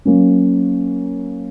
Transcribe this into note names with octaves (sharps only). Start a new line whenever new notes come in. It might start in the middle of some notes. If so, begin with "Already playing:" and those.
F#3 A#3 C#4